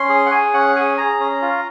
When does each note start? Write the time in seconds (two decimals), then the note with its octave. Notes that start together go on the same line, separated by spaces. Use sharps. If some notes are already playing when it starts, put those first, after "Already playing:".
Already playing: C#4 C6
0.09 G#4
0.26 F#5
0.31 G#4 G#5
0.54 C#4 F#5
0.76 G#4 G#5
0.98 G#4 A#5
1.20 C#4
1.42 F4